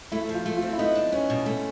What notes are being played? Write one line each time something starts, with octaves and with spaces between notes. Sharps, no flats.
A3 E4
F3
F4
A3
F4
C4
E4
B3 D#4
D4
B3 C#4
B2
A3